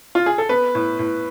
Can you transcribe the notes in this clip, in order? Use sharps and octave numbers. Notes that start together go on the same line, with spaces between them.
F4
G#4
A4
B3 B4
A2
A2